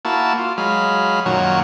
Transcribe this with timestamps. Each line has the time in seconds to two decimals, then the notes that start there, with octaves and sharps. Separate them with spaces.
0.05 A#3 E4 F#4 A5
0.38 F4
0.58 F#3 G#3 F5 B5
1.26 F#2 A#2 D#3 F#3 C#5 F#5